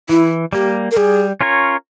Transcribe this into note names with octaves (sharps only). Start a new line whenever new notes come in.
E3 E4
G3 A#3 G4
A#4
G3 G#4
C#4 F4 A#4 C#5